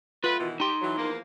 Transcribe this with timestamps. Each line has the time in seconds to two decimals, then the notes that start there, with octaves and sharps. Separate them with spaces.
0.24 F#3 A3 F4 B4
0.40 B2 D#3 E3
0.60 D#4 G4 C6
0.82 E3 F#3
0.98 E2 F3 A#3